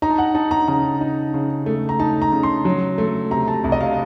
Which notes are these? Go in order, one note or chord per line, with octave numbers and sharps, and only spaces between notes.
D#4 A#5
A5
F#5
D#4 A5
A#5
C#3 A#5
D#4
C#3
A3
A#5
D#4 A5
A#5
C#3
C6
F#3
A3
C3 A#5
A5
C2
D#5
F5